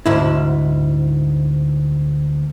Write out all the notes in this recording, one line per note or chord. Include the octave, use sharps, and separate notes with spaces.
D2 G#2 E4